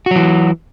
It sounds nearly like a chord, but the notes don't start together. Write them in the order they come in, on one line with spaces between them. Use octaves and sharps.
F#4 F#3 E3